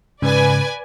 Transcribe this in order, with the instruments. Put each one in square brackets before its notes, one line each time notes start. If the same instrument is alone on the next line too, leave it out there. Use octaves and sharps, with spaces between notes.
[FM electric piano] G#2 C#3 [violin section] B4 D5 G#5